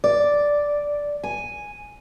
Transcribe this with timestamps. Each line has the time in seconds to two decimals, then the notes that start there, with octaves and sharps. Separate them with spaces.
0.04 D5
1.24 G#5